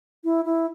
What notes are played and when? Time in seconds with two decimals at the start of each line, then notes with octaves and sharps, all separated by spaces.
0.24 E4
0.45 E4